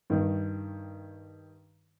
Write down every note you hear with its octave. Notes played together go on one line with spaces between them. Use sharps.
G2 D#3